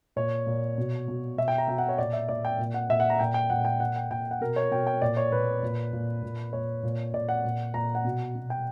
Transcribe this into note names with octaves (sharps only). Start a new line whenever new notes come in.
A#2 C#5
A#2
B2
B2
B2 E5
G5
A#5
B2 G5
F#5
C#5
A#2 D5
E5
A#2 D5
G5
A#2
F#5
A#2 E5
F#5
A#5
A#2 G5
G5
A#2 F#5
G5
A#2 F#5
G5
A#2 G5
F#5
B2 A#4
C#5
B2 G5
G5
A#2 D5
C#5
A#2 B4
A#2
A#2
A#2
A#2 C#5
A#2
A#2 D5
F#5
A#2
A#2 A#5
F#5
B2
B2
G5